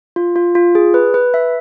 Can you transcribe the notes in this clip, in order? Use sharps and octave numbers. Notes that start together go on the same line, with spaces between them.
F4
F4
F4
G#4
B4
B4
E5